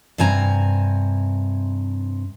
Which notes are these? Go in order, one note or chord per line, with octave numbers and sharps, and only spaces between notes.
G2 C3 C4 G#5 A#5